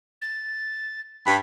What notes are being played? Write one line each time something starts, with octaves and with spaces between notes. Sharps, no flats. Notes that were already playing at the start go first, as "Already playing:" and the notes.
A6
G2 G5 B5